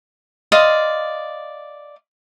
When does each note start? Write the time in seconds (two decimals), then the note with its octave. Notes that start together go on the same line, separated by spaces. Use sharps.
0.52 D5 D#5 F5 C6